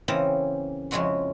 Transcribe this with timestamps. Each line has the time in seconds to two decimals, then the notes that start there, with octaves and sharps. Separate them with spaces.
0.08 C#3 E3 A#3 C4 A#5
0.91 F2 C#3 G#3 E4 F#4 C6